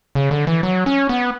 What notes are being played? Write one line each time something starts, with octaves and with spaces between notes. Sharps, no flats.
C#3
D3
E3
F#3
C#4
B3